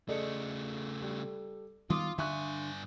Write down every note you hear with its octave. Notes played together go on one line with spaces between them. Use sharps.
C#3 A3 G#4 A4 D5 D#5 C#7
G3 A4
D#3 G3 B3 F4 F5 C6 D6 D#6
G2 D3 E5 G#5 C#6 F#6